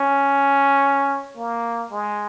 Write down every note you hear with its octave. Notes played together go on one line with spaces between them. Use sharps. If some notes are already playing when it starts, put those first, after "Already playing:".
Already playing: C#4
A#3
G#3